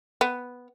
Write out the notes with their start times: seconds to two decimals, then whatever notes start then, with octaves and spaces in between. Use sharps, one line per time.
0.21 B3